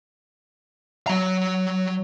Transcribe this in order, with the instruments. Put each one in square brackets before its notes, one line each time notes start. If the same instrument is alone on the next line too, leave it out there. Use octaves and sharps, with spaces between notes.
[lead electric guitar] F#3 A#5